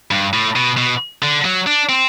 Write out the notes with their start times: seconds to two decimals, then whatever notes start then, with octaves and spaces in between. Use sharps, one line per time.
0.11 G2
0.33 A2
0.56 B2
0.77 B2
1.22 D3
1.45 F#3
1.67 D4
1.89 C4